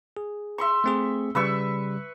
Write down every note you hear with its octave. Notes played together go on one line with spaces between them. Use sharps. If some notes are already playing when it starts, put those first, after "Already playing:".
G#4
E5 C6 C#6
A3 C4 G#4
C#3 G3 B4 E5 C#6